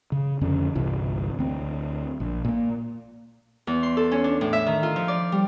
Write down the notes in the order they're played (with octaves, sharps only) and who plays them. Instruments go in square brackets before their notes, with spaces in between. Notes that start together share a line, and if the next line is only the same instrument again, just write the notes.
[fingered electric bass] C#3
F2 D3 C#4
G1 C2 C3 E3
D2 C4
A#1
A#2 A#3
[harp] E2
C6
A4
C#4
D4
A2
E5
D#3
F4
F3
D5
G3